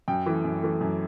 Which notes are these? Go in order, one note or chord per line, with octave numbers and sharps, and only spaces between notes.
F#2 G5
E3 A3
F#2
E3 A3
F#2